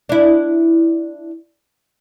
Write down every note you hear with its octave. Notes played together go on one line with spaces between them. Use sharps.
D4 E4